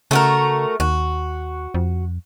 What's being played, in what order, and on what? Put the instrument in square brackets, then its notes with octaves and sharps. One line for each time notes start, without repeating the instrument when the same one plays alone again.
[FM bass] C#3 [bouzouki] A3 F#4 A#4
[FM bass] D#2 [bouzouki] F#4
[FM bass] F2